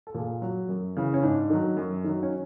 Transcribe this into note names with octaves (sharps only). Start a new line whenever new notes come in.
A4
A#2 G#4
F#3
F#2
C#3 E3
C#4
G#2 D4
D#3 F#3
F#2
D#3 F#3
C#4